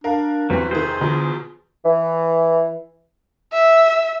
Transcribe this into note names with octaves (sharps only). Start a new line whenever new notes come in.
D4 A#4 F5
E2 G2 E3 F#3 C4 B4
C3 D#3 G#4 C5
E2 B2 D3 F4
E3
E5